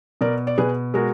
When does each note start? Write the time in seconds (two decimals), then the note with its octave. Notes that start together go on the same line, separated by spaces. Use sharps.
0.21 B2 A#4 D5
0.47 D5
0.58 B2 G#4 B4
0.94 G#3 F#4 A#4